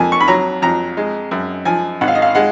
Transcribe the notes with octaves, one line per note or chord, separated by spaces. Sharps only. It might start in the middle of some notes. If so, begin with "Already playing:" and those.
Already playing: F2 A#3 G#5
C#6
B5
F#3 A#5
F2 A#5
G#3
F#2
F3 G#5
G#1 F#5
F5
D#5
F5
G#3 F#5